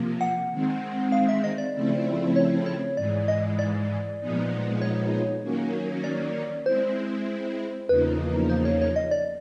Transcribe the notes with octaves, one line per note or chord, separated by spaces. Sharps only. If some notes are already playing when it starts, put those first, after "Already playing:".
Already playing: C3 F3 A#3
F#5
D#3 G#3 C4
F5
E5
D#5
D5
C#3 F3 A3 C4 E4
C#5
C#5
G#2 E3 G#3 D5
D#5
D5
A#2 F3 G#3 B3 D#4
C#5
D#3 F#3 A#3 C#4
D5
G#3 C4 E4 C5
E2 C#3 F3 A#3 D#4 B4
C5
C#5
C#5
D#5
D5